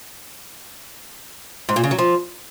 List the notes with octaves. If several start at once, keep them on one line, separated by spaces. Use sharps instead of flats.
G#2
A#2
C#3
F#3
F3